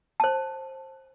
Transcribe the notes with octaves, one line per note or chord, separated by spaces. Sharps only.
C5 A5